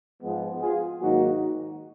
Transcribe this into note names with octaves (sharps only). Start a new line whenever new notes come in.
G#2 F3 G#3 B3
F4 G#4
G#2 D#3 F#3 A#3 D#4 F#4